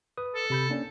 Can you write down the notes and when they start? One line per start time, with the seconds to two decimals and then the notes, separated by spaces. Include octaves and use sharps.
0.17 B4 D#6
0.35 A4
0.50 C3 B5 G6
0.70 A#3 C#4 D4